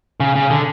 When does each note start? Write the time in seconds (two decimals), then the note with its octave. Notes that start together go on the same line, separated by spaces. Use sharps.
0.20 C#3
0.36 C#3
0.50 D3